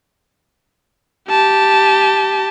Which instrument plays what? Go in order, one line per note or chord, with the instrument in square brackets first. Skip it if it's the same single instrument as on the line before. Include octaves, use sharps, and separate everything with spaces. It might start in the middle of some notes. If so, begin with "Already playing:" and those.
[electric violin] G4 A5